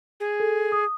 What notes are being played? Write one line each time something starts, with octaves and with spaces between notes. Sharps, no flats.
G#4
A4
D#6